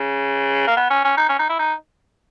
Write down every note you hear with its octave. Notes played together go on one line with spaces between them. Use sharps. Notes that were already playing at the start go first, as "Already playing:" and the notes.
Already playing: C#3
A#3
B3
C#4
C#4
D#4
C#4
D#4
E4
D#4